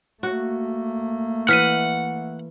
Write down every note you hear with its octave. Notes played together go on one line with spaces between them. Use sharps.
A3 A#3 F#4
E3 F#5 F6 B6 D#7